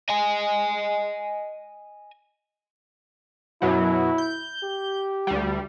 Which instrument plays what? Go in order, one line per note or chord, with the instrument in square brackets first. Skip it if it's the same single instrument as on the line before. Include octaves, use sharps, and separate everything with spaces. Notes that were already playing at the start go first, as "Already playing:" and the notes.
[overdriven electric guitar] D#5 G#5
[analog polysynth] F#2 B2 F#3 [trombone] E4
[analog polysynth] G6
[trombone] G4
[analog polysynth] D2 G3